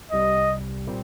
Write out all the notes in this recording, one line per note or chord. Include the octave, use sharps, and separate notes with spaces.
C2 C3 G3 D#5
A#2 G3 C4